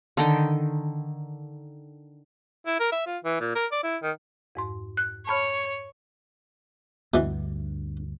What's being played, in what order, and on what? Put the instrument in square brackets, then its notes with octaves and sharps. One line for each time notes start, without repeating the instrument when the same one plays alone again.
[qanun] D3 D#3 G5
[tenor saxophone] E4
A#4
E5
F4
E3
A#2
A#4
D5
E4
D#3
[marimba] F2 G#2 C6
F#6
[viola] C#5 [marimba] A5 B5 F6
[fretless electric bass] D2 G2 [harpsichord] B2 E3